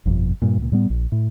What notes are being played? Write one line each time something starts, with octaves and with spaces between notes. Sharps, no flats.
G1 F2 B2
G2 A#2
C#2 A#2
A2 G3 B3
A#1
A2